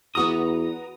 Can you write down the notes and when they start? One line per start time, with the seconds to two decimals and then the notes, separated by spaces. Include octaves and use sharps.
0.15 E2 B3 F#4 A#5 D#6